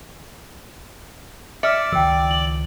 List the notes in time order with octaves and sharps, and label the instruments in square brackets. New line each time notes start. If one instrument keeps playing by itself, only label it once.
[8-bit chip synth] D5 [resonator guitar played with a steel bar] E5 [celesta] D6 F6 C#7
[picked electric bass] C#2 D#3 F3 [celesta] G5 E6
[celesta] F#7